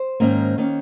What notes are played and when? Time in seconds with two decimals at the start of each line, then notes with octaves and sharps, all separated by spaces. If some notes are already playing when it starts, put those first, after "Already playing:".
Already playing: C5
0.20 G#2 D#3 A#3 C#4
0.58 D#3 A#3 C#4